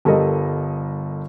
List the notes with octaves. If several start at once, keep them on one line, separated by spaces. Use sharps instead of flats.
G1 G3 A4 A#4 D#5